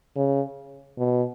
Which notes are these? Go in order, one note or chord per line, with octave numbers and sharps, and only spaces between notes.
C#3
B2